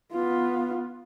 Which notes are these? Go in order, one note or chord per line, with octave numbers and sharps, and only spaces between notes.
B3 F4